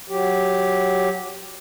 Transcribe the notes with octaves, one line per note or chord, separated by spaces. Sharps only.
F#3 G4